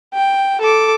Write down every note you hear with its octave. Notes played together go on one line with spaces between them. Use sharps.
G5
A4 D6